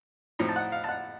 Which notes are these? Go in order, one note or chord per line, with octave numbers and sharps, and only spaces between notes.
A2 F3 C4 D#4
A5
F#5
F5
A5
F#5